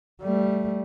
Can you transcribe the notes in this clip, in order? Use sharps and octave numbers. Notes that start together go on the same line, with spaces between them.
G3 A3